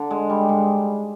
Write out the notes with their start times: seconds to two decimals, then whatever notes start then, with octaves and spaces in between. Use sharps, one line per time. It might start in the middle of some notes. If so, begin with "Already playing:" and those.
Already playing: D3
0.11 G#3
0.30 G3
0.49 G#2